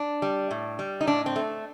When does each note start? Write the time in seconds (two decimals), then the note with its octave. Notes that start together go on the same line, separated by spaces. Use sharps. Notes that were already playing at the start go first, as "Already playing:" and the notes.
Already playing: D4
0.22 G3
0.51 A2
0.79 G3
1.01 D#4
1.07 A2 D4
1.26 C4
1.36 A3